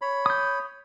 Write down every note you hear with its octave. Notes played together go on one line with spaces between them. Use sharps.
C#5 B5
D#6 G6